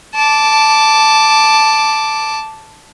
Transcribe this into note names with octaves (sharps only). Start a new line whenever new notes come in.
A5 D6